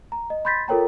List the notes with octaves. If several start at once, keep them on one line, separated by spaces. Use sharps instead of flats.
A#5
D#5
B5 C6 G6 A6 B6
F4 A4 A#4 C#5 G5 A#5